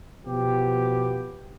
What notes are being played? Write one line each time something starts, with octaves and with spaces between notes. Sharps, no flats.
B2 F3 B3 G4